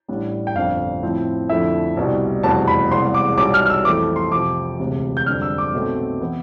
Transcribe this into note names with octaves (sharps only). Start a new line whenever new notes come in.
A1 A2 G3 D4
G5
G1 F2 D3 F5
A2 F3 C4 E4
F2 D3 F3 A3 E4 E5
C2 B2 G3
F1 E2 B2 G3 B3 A5
B5
E1 E2 C3 G3 B3 C6
D6
B1 B2 G3 D6
F6
F6
E6
F2 E3 A3 D6
C6
F2 C3 F3 D6
E1 D2 C3
G6
F2 D3 G3 F6
E6
D6
B1 B2 A3 C4
E3 B3 E4